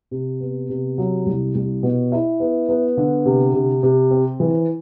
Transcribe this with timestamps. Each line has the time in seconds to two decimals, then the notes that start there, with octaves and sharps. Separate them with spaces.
0.11 C3
0.40 B3
0.69 C3
0.98 F#3
1.26 C2
1.55 C2
1.83 B2
2.12 E4
2.40 B3
2.69 B3
2.97 D3
3.25 C3
3.54 C3
3.83 C3
4.11 C4
4.40 E3